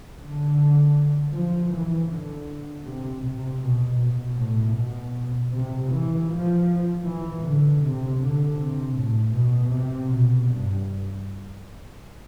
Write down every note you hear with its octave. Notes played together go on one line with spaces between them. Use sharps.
D3
F3
E3
D3
C3
C3
B2
B2
A2
B2
C3
E3
F3
E3
D3
C3
D3
C3
A2
B2
C3
B2
G2